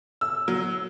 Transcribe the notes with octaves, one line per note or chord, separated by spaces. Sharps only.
E6
F#3